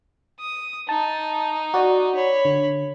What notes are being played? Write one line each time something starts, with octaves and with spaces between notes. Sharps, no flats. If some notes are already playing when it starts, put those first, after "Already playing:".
D#6
D#4 A5
F#4 D5
C#5 B5
D3